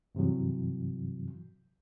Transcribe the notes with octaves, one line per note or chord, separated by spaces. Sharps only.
G2 C3 E3 F#3